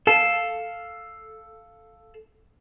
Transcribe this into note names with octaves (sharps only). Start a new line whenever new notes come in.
A4 F5 A5